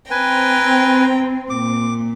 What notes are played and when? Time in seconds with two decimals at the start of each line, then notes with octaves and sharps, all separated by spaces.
0.11 C4 B4 G5 G#5 A#5
1.50 A#2 D6